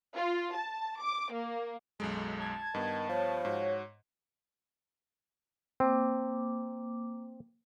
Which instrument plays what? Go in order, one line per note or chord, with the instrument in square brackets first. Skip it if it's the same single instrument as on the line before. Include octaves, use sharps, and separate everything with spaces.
[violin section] F4
A5
D6
A#3
[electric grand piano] B1 F#2 G#3 [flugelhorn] A4
[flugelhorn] A5 [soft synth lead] G#6
[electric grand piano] G2 B3 [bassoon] D#3
[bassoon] F3 [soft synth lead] C#5
[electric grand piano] G#2 [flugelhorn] F#4
[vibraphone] A#3 D6 [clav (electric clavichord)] C4